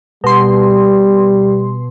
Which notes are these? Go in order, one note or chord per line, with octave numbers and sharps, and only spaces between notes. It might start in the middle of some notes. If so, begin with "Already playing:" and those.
B2 G3 C6